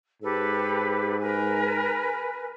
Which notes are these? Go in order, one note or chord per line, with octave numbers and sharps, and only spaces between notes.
G#2 G4 A4 B4
A#4 B4 G#5